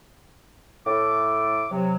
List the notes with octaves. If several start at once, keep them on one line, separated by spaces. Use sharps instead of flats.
A2 A4 D6
C3 F#3